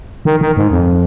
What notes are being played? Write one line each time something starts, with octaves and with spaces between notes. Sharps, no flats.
D#3
D#3
G#2
F2